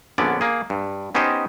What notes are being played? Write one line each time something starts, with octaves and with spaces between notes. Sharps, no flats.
A#1 D3 B3 C#4 D5
A#3 G#4
G2
B3 C#4 D#4 G4 C5 D#5